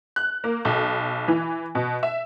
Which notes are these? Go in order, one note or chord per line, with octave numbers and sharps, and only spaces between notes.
F#6
A#3
B1
E3
B2
E5